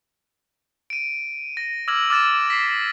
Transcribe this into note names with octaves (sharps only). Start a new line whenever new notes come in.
D7 D#7
A#6
D6 E6 F6 G#6 A#6 F#7
D6 F6 A6 E7
B6 C7